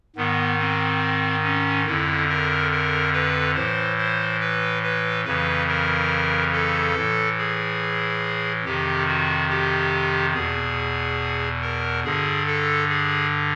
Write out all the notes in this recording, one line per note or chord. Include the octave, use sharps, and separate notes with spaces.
G#2 D#3 B3
C4
C#4
F2 D3 E4
A#4
A#4
B4
A2 E3 C5
C5
B4
B4
F2 C#3 E3 B4
A#4
A4
A2 E3
G#4
F2 C3 D#3 G4
F#4
G4
E2 B2 G#4
A#4
G2 D3 G#4
A4
G#4